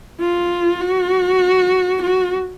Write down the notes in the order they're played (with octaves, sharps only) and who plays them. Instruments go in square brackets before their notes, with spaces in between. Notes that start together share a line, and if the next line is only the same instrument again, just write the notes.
[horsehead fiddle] F4
F#4
F#4